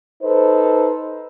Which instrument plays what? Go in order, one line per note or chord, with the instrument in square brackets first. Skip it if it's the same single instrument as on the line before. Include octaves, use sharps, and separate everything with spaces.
[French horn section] D#4 A4 B4 C5